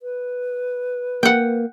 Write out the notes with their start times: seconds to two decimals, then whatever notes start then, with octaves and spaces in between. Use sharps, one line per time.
0.02 B4
1.23 A#3 F#5 G5